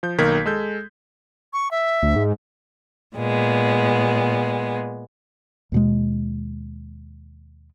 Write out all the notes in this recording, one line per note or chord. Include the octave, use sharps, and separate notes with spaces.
F3 G6
B1 D#3 A#3 A#4 G#6 B6
G#3 A4 G6
C#6
E5
D2
G#2
A#2 G#3 B3
D#2 B2 G#3